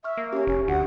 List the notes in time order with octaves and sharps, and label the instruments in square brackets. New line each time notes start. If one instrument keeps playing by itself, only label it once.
[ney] E5 [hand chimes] C#6 F6
[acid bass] A#3
[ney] C#4 [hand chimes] G4 C#6
[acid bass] F1 [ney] C#4
[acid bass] D2 [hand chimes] D4 F#4 G4 [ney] F#5